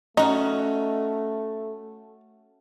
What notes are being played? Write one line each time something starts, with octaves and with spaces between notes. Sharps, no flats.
A3 C#4 D#4 F#4